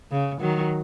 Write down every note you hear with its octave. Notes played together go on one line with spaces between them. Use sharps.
C#3
D#3 F#3